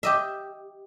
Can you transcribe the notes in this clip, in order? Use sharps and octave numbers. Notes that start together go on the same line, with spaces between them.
G4 D#5 E5